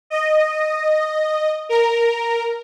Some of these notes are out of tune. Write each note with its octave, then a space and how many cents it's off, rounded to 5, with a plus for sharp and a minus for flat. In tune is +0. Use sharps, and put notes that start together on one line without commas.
D#5 -10
A#4 -5